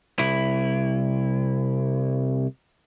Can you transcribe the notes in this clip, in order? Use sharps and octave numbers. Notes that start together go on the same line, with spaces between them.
C2 E4